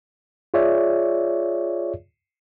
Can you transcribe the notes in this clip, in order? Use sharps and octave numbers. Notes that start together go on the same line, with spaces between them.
F4 G#4 C#5 D5 E5